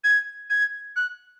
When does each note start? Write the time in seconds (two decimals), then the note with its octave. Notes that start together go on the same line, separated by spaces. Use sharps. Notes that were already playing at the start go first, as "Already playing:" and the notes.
0.04 G#6
0.50 G#6
0.96 F#6